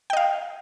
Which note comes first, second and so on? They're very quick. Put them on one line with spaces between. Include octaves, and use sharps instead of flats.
G5 D#5 F5